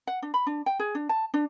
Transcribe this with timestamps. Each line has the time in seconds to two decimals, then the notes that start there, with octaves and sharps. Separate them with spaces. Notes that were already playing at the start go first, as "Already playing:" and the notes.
0.07 F#5
0.22 D4
0.34 B5
0.47 D4
0.66 G5
0.79 G#4
0.95 D4
1.09 A5
1.34 D4